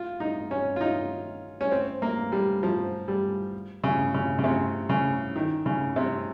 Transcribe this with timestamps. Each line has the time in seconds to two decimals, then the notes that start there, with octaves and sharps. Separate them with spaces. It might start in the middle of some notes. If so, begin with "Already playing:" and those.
Already playing: F4
0.20 D#4
0.51 C#4
0.76 F4
0.81 D#4
1.61 C#4
1.72 C4
2.02 A#3
2.32 G3
2.63 F3
3.08 G3
3.84 C#3
4.14 C#3
4.39 C#3
4.44 C3
4.89 C#3
5.36 D#3
5.66 C#3
5.96 C3